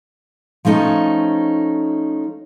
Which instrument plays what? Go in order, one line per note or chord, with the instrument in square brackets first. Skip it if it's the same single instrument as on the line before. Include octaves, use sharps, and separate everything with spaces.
[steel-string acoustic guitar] F3 A3 C#4 D#4